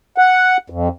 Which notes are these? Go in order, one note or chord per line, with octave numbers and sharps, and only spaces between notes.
F#5
F2